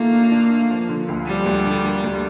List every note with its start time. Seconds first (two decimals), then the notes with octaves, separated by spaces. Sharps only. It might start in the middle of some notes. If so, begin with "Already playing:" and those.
Already playing: D#3 A3 A#3 F4
0.13 D4
0.32 D4
0.51 F4
0.70 F3
0.89 D3
1.08 D2
1.27 F3 G3
1.46 D2
1.66 D3
1.85 A#3
2.04 D2